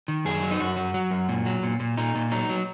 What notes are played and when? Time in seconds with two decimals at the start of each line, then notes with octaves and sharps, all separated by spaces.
0.08 D#3
0.25 F#2 G#4
0.42 F#3
0.51 D#4
0.60 F#2 F#4
0.77 F#3
0.94 F#3
1.11 F#2
1.29 A#2
1.46 F#3
1.63 A#2
1.80 A#2
1.97 A#2 D#4
2.15 A#2
2.31 F#3 D#4
2.49 F#3